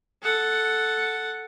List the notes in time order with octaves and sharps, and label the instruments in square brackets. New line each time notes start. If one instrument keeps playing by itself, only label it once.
[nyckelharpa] A4 F#5